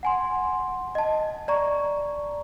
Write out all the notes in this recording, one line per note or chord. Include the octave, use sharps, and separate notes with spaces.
F#5 G#5 C6
D#5 A5
D5 A#5 C#6